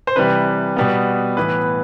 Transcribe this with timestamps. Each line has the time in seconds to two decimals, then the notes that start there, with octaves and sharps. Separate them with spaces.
0.07 C5
0.16 C3 E3 G3 B4
0.76 B2 G3 B3
1.37 A2 E3 B3 B4